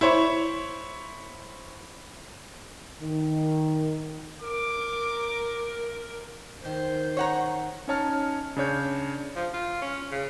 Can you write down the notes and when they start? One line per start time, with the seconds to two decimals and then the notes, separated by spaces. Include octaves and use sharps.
0.01 E4 C5 C#5
3.02 D#3
4.41 A#4 D6
6.65 D#3 C5
7.17 C#5 F#5 A#5
7.88 C#4 D#4 C#5 A5 F6
8.56 C#3 D4 C#5 G6
9.36 F3
9.53 F4
9.82 C#4
10.11 C#3